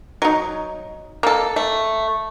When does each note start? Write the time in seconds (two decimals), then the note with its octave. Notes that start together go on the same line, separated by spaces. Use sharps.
0.22 F#3 D#4
1.23 A#3 A4
1.56 A3